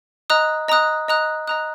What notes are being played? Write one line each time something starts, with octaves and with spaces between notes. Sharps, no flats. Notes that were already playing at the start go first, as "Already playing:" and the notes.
D#5 A#5 D#6 F#6
D#5 A#5 D#6 F#6
D#5 A#5 D#6 F#6
D#5 A#5 D#6 F#6